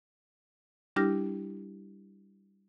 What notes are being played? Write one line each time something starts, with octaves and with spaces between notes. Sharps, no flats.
G3 D4 E4 G4 F6 A#6